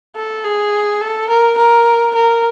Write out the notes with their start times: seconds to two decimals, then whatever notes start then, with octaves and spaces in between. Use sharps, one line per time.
0.16 A4
0.45 G#4
1.01 A4
1.29 A#4
1.58 A#4
2.15 A#4